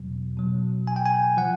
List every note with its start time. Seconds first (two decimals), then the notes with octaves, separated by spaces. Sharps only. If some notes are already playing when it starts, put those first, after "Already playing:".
Already playing: E2 B2 F#3
0.37 B2 F#3
0.87 G#5
0.96 G5
1.06 G#5
1.37 F3 F#5